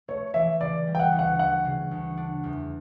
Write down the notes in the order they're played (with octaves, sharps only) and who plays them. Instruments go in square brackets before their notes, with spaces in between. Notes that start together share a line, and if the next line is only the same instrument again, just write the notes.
[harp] A3 [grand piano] C#5
[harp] E3 [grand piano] E5
[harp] C#3 [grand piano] D5
[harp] G3
[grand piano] G5
F#5
[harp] D2
[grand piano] F#5
[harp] E3 [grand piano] F#5
[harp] C#3
D2
D4
E2